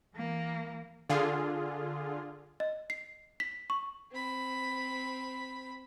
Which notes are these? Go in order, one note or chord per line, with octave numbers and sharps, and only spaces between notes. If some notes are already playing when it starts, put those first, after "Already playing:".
E3 A#3
D3 F4 G#4
D#5
C7
B6
C#6
C4 B5